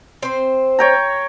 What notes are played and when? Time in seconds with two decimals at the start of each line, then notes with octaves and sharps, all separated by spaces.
0.22 C4 C5
0.79 C#5 G5 A#5